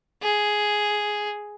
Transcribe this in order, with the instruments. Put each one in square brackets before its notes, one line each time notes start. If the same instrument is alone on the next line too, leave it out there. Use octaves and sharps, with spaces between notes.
[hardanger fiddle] G#4